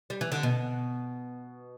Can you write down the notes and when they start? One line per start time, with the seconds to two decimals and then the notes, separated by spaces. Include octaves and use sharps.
0.10 G3
0.21 E3
0.32 D3
0.43 B2